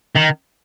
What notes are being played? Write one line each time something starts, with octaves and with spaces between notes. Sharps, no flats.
D#3